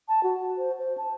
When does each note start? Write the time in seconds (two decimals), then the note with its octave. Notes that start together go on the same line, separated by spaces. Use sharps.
0.09 A5
0.23 F#4
0.58 C5
0.79 C5
0.98 A5